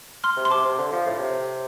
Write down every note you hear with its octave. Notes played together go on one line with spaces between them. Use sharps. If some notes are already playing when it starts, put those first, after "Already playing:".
C6 F6
C3
C6
C3 A5 D6
C3
D3
F3
A2
C3